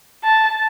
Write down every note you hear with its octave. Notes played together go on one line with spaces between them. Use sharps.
A5